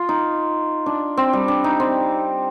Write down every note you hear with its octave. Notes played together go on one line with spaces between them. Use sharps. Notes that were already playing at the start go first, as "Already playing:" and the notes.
Already playing: F4
D#4
D4
C4
G3
D4
D#4
C4